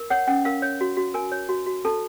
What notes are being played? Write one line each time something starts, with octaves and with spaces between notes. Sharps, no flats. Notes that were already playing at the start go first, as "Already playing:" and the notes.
Already playing: A#4
C#5 F#5
C#4 F#5
A#4 F5
C#5
F#4
F#4
A#4 G#5
C#5
F#4
F#4
A4 A5